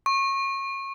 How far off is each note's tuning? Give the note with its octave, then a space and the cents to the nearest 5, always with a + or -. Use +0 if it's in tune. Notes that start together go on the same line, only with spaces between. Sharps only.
C#6 -25